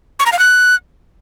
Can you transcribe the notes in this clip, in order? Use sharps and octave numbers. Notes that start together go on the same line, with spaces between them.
C#6
A#5
F5
F#6